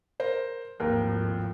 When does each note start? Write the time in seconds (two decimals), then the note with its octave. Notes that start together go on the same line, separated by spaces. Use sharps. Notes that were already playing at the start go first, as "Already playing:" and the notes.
0.20 A#4 C5
0.80 G#1 D#2 A2 F3 A#4